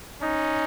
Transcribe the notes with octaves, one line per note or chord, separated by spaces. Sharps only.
C#4 D#4